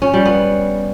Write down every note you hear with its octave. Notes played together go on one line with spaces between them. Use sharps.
C#4
G3
B3